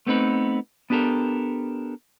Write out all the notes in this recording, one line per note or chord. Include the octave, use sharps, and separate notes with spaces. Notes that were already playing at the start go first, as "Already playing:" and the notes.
A3 B3 C4 D#4 B4
B3 D4 G4 A4 A#4